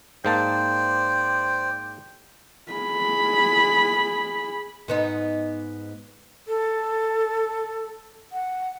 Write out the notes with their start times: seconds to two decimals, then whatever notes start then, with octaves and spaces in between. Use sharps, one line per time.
0.25 G#2 A#3 C5 D5 G5 A5
2.72 G#4 B5
4.88 G#2 B3 D#4
6.47 A4
8.33 F#5